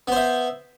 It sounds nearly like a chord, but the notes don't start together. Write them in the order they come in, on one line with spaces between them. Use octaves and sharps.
B3 C5 E5